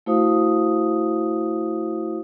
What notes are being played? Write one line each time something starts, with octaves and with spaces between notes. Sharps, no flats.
A3 E4 F#4 C5 F5 D#6